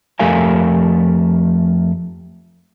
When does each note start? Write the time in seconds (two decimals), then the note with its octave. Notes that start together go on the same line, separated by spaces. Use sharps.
0.19 F2 A3 G4 A#4 F5 G#5